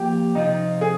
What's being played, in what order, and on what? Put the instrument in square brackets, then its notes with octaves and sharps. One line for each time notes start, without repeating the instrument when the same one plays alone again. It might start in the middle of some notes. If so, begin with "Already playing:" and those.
Already playing: [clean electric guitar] F3 A#3 F4 C5 [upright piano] G4
[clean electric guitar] C3 F3 C4 F4 [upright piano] D#4
[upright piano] G#4